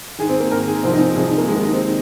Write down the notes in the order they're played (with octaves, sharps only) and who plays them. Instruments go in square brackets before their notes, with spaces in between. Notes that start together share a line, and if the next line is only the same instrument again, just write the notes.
[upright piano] G#2 D#3 G#4
C4
A#3
G#2 D#3 A#4
G#4
C2 C3 F3 C4
D#4
C4
C2 C3 F3 G#4
D#4
A#3
D#2 D#3 G#3
A#3
D#4
C4
D#3